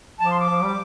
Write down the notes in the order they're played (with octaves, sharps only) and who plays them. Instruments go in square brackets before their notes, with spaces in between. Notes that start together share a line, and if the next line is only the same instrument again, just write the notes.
[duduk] F3 [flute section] A5 D6
[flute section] C6
D6
[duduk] F3
G3